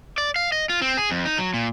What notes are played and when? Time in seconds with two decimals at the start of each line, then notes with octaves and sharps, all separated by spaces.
0.18 D5
0.36 F5
0.52 D#5
0.69 F4
0.82 C4
0.97 G#4
1.11 F2
1.25 D#4
1.38 F#3
1.54 A#2